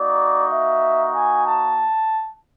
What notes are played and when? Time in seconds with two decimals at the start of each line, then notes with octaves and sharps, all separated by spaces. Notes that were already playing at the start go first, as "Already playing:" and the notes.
Already playing: A#3 D#4 F#4 D5
0.50 E5
1.13 G#5
1.46 A5